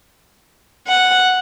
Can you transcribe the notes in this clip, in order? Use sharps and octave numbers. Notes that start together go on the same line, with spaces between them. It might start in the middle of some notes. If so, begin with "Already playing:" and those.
F#5